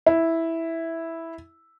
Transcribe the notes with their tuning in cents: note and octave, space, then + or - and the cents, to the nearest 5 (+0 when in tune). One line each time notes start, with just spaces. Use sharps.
E4 -5